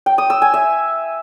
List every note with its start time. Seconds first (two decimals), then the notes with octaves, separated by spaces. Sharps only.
0.06 G5
0.18 D#6
0.30 E6
0.42 G#5
0.54 E5